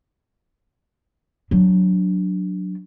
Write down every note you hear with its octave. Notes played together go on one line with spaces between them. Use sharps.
F#3 D4